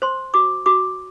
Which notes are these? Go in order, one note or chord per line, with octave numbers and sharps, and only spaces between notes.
C5 C6
F#4 D6
F#4 D6